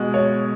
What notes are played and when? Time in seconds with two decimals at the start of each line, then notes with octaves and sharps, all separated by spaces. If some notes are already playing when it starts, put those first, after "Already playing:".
Already playing: B2 G#3
0.14 C#5